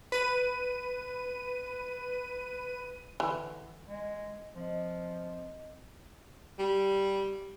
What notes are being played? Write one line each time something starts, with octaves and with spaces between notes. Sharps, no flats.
B4 D#7
D3 E3
G#3
F3 C4 D#5
G3